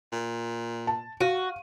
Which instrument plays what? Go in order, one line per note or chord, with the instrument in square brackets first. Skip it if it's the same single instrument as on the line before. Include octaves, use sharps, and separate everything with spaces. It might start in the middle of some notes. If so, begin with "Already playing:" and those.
[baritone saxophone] A#2
[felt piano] A5
[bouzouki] F#4 [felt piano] F5 D#7